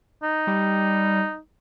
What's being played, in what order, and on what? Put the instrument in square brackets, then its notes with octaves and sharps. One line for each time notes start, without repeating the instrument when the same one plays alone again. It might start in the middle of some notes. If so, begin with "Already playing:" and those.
[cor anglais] D#4
[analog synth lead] G3